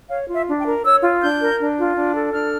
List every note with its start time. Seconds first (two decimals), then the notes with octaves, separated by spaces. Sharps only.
0.09 C#5 F5
0.28 F4
0.34 E5
0.47 D4
0.59 G5
0.65 A#4
0.84 C#5 E6
1.02 F4
1.21 D4 G6
1.40 A#4
1.59 D4
1.77 F4
1.95 D4
2.15 A4
2.33 D4 F6